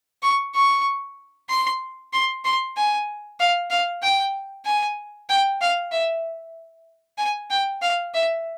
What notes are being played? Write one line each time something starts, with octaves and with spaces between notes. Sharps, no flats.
C#6
C#6
C6
C6
C6
G#5
F5
F5
G5
G#5
G5
F5
E5
G#5
G5
F5
E5